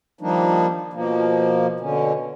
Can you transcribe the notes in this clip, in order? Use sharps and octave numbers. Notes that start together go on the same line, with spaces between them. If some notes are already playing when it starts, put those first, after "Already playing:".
D#3 F3 G3 A#3 D4 D#4
B2 F3 A#3
B2 D3 C#4